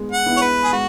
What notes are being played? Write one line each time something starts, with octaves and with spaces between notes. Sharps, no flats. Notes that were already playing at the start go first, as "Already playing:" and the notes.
Already playing: G#3 B3
F#5
B3 E4
C#5
B4
G#4
G#3 F#4